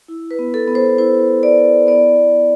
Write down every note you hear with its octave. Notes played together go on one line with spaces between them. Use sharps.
E4
B4
B3
A4
B3
C5
E4 C5
E4
D5
E4
B3 D5
B3